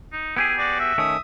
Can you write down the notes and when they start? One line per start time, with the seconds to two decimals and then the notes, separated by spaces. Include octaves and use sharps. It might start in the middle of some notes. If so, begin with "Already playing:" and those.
0.12 D#4
0.37 B3 E4 G4 G#4 G#5
0.58 F#4 D5
0.79 E5
0.98 D#3 A3 C#4 D#6